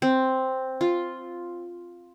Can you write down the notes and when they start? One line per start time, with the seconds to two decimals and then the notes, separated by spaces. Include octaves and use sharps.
0.02 C4
0.81 F4